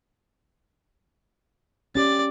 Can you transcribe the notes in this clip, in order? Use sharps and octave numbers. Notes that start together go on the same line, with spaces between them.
C#4 G4 D5 A6